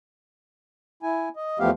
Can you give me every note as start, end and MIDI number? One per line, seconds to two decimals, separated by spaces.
1.03 1.29 64
1.03 1.29 80
1.36 1.58 75
1.60 1.70 40
1.60 1.70 53
1.60 1.70 57
1.60 1.70 59
1.60 1.70 67
1.60 1.70 77